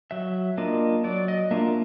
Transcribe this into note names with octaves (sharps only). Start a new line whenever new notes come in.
F#3 E5
A#3 D4 F4 D#5
F#3 D5
D#5
A#3 D4 F4 E5